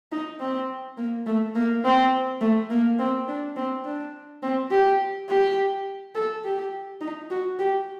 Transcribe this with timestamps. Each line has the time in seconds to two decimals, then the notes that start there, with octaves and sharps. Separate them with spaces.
0.12 D#4
0.40 C4
0.97 A#3
1.26 A3
1.55 A#3
1.85 C4
2.41 A3
2.70 A#3
2.99 C4
3.28 D4
3.56 C4
3.85 D4
4.43 C4
4.71 G4
5.29 G4
6.15 A4
6.44 G4
7.01 D#4
7.30 F#4
7.59 G4